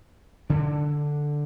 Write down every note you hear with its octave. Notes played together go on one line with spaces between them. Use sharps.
D3 D4